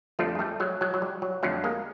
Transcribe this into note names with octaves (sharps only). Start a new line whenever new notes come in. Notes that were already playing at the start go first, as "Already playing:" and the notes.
F2 D3 F3 G3 A3
G#3
G3 A3
F#3 G#3
F#3 G#3
F#3
G3
F#3
F2 D3 F#3 G3 A3
G#3 A#3